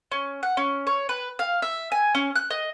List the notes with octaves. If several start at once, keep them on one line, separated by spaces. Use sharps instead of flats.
C#4
F#5
C#4
C#5
B4
F5
E5
G#5
C#4
F#6
D#5